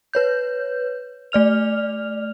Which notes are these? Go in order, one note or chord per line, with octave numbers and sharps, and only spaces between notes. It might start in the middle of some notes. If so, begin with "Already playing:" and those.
B4 C#5 G6
A3 D5 F6 F7